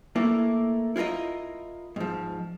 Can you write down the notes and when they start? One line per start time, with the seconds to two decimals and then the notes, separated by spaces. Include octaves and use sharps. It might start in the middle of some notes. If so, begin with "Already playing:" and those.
0.15 A3 A#3 E4
0.96 E4 F4 G#4 A#4 D#5
1.96 G#2 F3